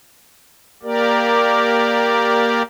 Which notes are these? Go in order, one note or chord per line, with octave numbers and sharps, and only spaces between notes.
A#3 G4 A#4 D5